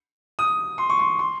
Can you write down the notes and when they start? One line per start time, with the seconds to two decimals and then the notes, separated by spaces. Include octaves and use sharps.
0.39 D#6
0.78 C6
0.90 C#6
0.99 C6
1.19 C6